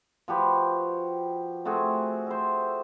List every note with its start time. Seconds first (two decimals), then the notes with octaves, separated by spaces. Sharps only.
0.28 F3 F#4 G4 B4
1.65 A3 C4 F#4 G#4
2.27 C5 E5